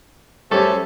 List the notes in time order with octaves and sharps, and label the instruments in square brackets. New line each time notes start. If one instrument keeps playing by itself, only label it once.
[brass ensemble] F#2 A3 C5 [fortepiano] G3 C#4 G4 [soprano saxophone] A4